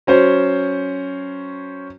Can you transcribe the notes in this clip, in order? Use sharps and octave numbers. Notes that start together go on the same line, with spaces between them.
F#3 C#4 C5